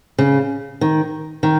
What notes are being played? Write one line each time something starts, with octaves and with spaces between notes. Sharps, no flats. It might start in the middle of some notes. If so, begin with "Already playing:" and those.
C#3
D#3
D#3